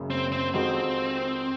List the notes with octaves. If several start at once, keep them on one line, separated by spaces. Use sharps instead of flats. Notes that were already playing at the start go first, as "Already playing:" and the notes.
Already playing: F#1 F#2 C#3
C4
C4
F2 D#3 G#3 C4 D#4 F#4